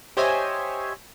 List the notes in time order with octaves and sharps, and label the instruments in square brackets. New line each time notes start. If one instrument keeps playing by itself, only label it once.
[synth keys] G4 C5 C#5 D#5 E5 G#5